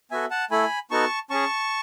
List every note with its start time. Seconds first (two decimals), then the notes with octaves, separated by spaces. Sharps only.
0.11 B3 F#4 A4 E5 G#5
0.30 F#5 A5
0.51 A3 E4 A4 G#5 B5
0.91 B3 D#4 F#4 A4 A5 C#6
1.30 C#4 G#4 A5 C#6